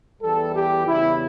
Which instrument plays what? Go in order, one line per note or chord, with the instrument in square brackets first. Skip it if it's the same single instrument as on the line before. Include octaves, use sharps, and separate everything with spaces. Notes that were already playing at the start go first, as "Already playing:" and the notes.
[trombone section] E2 E3 G3 A4
G4
E2 C#3 G3 E4